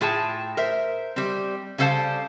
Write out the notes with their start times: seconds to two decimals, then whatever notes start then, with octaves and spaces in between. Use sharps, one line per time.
0.01 A2 F4 G#4 G5 A5
0.57 A#4 C5 E5
1.16 G3 C4
1.78 C#3 G3 A4 C5 F5 A5